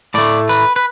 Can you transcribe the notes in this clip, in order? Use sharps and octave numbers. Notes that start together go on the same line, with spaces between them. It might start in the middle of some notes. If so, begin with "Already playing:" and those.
A2 A3 D5
B4
B4